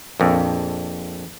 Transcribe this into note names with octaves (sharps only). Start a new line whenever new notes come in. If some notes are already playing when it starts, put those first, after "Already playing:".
A#1 F2